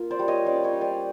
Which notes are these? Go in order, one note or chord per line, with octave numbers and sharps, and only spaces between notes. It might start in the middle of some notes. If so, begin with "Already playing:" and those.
Already playing: A#3 F4
C5 D5
G3
C#5 D#5
C#4 C5 D5
C#5 D#5
G3
C5 D5